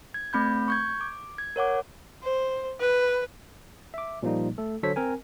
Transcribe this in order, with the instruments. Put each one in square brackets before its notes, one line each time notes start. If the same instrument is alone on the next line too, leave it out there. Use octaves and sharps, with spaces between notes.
[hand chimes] G#6
A3 C4 B5 G6
C#6 G6 G#6
D6
G#6
A#4 C#5 F#5 D6
[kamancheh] C5
B4
[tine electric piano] E5 D6
A#2 F3 G3 A#3 D#4
A3 A4
D3 F#3 A4 C5 C#5 B6
C4 A#4 G#5